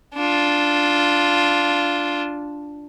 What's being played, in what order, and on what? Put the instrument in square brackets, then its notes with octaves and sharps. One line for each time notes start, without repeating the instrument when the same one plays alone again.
[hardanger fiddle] D4 F4